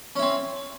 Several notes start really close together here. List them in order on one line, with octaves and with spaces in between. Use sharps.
C#4 E4 C4